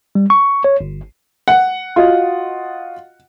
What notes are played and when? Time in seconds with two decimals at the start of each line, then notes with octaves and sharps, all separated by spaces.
0.15 G3
0.30 C#6
0.64 C#5
0.81 G1
1.48 F#5
1.96 F4 F#4 D#5